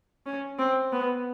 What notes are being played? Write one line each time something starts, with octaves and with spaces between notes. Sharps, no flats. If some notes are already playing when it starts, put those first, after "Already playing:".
C#4
C4
B3